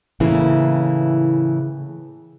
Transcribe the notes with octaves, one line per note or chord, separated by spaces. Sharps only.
A2 C#3 E3 A#3 E4